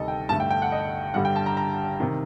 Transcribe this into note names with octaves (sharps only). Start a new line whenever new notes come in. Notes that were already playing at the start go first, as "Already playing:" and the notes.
Already playing: D2 C3 D#3 G3 A4 D#5
G5
G2 D3 A3 A5
G5
G5
F#5
D#5
G2 D3 G3 F#5
G5
A5
A#5
A#5
C3 D#3